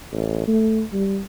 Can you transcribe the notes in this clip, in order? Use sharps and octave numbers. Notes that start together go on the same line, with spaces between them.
A1
A3
G3